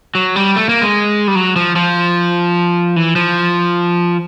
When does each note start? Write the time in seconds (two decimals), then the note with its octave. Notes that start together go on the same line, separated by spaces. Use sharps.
0.15 F#3
0.36 G3
0.56 A3
0.69 A#3
0.82 G#3
1.28 G3
1.35 F#3
1.56 F3
1.76 F3
2.96 E3
3.16 F3